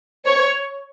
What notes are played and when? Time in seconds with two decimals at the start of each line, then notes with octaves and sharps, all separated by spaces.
0.26 C#5